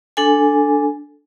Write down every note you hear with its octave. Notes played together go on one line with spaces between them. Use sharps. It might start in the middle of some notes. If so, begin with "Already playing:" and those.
D4 A4 G#5